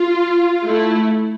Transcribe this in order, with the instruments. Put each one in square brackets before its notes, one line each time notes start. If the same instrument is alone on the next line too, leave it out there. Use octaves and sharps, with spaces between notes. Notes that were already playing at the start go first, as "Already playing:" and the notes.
Already playing: [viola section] F4
A3 E4